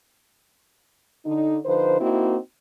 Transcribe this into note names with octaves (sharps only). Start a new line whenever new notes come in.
D3 D#4
D3 F3 D#4 B4 C5
A#3 C4 D#4 E4 F#4